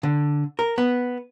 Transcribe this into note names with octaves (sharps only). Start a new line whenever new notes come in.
D3
A#4
B3